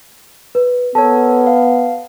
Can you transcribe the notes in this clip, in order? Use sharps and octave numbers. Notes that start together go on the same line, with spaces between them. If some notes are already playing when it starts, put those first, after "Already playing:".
B4
B3 A4 A#4 C#5 A5
F5